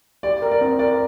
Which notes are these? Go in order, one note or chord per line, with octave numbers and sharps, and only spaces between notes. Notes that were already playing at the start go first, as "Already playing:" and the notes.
G4 D5
A#4
D5
C4
A#4 D5